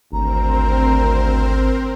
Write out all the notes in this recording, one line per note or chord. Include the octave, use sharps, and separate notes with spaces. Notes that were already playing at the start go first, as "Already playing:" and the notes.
G#1 D2 C4 A#4 C5 A#5